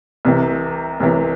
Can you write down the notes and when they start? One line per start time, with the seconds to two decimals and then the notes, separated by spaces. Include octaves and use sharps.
0.25 C2 C3 E3
1.00 C2 C3 E3